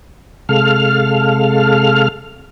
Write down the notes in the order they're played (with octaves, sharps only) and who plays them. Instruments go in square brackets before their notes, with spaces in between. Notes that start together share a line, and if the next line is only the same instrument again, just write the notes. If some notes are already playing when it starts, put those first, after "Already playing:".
[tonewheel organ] C3 G#3 A4 F5 F6